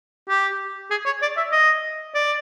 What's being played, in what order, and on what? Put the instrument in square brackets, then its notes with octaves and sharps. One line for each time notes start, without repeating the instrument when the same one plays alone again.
[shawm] G4
G#4
C#5
D5
E5
D#5
D5